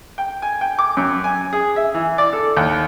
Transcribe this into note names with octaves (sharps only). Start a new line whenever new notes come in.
G5
G#5
G5
D6
F#2
G#5
G#4
E5
E3
D5
A4
D#2